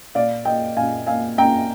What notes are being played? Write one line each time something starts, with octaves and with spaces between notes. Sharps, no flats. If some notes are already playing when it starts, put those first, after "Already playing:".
A#2 D5 F5
A#3 D#5 G5
A#2 F5 G#5
A#3 F5 G#5
A#3 G5 A#5